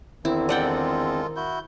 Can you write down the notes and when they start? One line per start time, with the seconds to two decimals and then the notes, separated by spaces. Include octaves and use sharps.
0.25 E2 D3 D#3 C4 E4
0.49 G#3 F4 A4 D5 F#5 G5
1.36 E4 F#4 G6